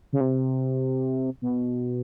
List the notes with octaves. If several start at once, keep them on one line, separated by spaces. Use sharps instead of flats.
C#3
C3
B2